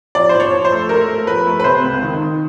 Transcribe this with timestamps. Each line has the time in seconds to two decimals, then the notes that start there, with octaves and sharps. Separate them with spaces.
0.15 F3 D5
0.29 C5
0.34 F3
0.40 C#5
0.52 F3
0.65 C5
0.72 A3
0.89 A3 A#4
1.08 A3
1.27 F3 B4
1.46 A3
1.60 B4
1.64 C3 C5
1.84 C#2
2.02 D#3
2.21 D#3